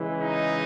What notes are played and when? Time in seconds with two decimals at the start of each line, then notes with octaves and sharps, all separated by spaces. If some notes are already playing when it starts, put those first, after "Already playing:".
Already playing: C#3 E3 G#3
0.21 D#4